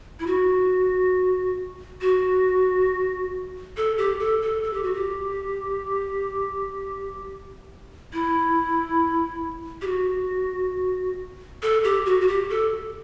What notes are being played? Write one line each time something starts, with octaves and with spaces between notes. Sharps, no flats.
E4
F#4
F#4
A4
G4
A4
A4
A4
G4
F#4
G4
E4
G4
F#4
A4
G4
F#4
F#4
G4
A4